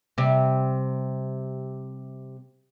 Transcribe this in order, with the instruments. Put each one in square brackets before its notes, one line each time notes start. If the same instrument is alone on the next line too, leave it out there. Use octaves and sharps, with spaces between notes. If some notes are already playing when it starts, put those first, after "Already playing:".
[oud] C3 G3